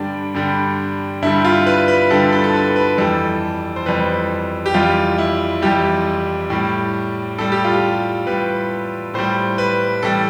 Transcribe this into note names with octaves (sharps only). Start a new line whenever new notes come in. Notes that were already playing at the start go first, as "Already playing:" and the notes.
Already playing: G2 D3 G3 D4
G2 D3 G3
G2 D3 G3 E4
F4
B4
B4
G2 D3 G3 A4
A4
A4
B4
B4
F2 E3 G3 A4
C5
F2 E3 G3 B4
G4
F2 E3 G3 F4
E4
F2 E3 G3 G4
A2 G3
A2 G3 A4
G4
F4
G4
A2 G3 B4
A2 G3 C5
B4
A2 E3 G3 A4